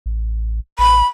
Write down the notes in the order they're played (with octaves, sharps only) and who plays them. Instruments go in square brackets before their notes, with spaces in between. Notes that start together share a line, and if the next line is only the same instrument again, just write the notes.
[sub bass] A1
[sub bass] A1 [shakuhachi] B5